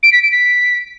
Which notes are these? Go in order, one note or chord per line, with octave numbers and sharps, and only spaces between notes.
D7
B6
D7
B6